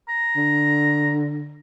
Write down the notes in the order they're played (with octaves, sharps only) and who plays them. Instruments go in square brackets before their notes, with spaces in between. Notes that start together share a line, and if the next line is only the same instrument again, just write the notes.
[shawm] A#5
[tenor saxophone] D3